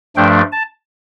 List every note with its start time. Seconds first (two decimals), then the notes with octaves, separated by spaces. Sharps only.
0.16 G2 F3 A3 D4 G5
0.52 A5